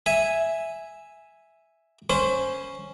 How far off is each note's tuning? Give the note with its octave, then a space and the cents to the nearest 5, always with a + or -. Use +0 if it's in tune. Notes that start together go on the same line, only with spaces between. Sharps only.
E5 +0 G#5 +0
C#4 +0 C5 +0 B5 +40